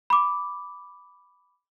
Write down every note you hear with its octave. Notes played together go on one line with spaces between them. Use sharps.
B5 D6